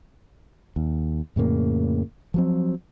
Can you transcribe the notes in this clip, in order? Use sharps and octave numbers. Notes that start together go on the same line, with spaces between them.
D#2
F2 A2 C#3 A#3
F3 F#3 C4